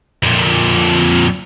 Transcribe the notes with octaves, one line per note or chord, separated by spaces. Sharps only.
F2 A#2